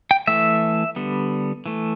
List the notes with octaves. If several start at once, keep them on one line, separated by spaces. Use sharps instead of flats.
G5
E3 A3 E5
D3 G3 B3
E3 A3